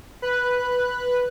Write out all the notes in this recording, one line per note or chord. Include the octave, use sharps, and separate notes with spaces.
B4 F#6